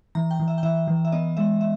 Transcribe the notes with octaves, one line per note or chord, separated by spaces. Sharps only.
E3 A#5
G5
E3
E5
G5
E3 E5
E3
E5
B3 D#5
G#3 E5
E5